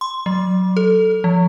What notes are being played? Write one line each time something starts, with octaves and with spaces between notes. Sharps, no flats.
C6
F#3
A4
F3